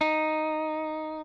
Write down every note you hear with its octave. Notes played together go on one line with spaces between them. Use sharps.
D#4